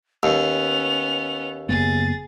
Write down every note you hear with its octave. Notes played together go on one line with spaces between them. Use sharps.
D#2 B3 C#4 F7
F#1 A#3 B3 G#4 A6